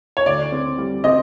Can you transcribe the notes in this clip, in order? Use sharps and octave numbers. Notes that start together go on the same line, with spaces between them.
C#5
D2 D5
C4
G3
C4 D#5